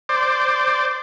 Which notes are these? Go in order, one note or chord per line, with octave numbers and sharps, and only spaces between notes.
C5 D5